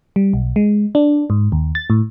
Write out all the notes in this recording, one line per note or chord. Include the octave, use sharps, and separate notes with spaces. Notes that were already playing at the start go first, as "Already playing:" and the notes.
G3
B1
G#3
D4
G#2
D#2
A6
A2